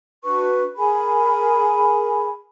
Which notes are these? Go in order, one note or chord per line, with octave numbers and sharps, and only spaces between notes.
D4 F#4 B4 C#6
G#4 A#4 G#5 B5